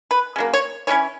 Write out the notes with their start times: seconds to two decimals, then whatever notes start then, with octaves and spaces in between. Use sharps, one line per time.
0.11 B4
0.36 C#3 F#3 A#3
0.53 C#5
0.87 E3 G#3 C#4 E4 C#5